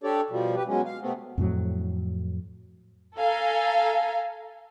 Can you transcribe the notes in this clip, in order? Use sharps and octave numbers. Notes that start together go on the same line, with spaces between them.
D4 G4 A4 C#5 D5
B2 F3 G3
G4 B4
B2 F#3 G#3 C#4
F5
C3 A3 B3 C4
F2 A2 F#3
A4 F5 G#5 A#5